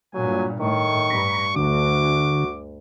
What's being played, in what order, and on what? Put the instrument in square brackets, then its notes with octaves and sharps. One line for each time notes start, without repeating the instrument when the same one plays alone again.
[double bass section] G2 A#2 [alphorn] F#3 [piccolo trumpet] G#5
[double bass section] A2 [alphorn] D#3 [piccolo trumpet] C#6
[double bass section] G2 [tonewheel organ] A#5 B5
[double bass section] D2 [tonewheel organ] D3 [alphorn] F#4 [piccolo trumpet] D6